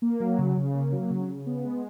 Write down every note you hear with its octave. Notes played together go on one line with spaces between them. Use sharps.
A#3
F#3
C#3
C#3
A#3
F#3
C#3
C#3
B3
G#3